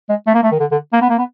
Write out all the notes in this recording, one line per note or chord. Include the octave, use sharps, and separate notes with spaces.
G#3
A3
A#3
A3
D#3
D3
D3
A#3
B3
A#3
B3